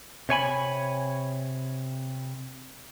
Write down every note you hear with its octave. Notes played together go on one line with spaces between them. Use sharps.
C3 C#5 G#5 B5